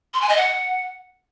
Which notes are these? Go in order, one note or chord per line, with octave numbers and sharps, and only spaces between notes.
C6
G#5
D#5
F#5